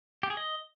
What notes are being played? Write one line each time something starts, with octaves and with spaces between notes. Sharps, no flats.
G4
G#4
D#5